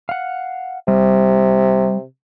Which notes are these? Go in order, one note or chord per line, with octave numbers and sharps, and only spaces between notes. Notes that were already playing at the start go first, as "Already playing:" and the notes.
F5 F#5
C3 G3